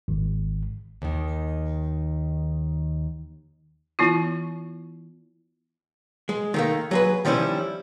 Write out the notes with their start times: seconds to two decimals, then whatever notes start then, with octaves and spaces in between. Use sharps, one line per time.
0.08 G#1
1.02 D#2 D#3
3.99 E3 B3 E4 F4
6.29 G#3
6.54 D#3 A3 A#3
6.91 F#3 G#4 B4
7.25 D#3 F3 G3 C#4 E4